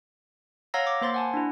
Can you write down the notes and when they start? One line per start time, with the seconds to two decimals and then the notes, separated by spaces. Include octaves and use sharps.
0.74 C#5 F5 F#5 A#5 E6 A#6
0.87 D6
1.01 A#3 C5 C6 A6
1.14 F#5 G#5 A5
1.34 D4 E4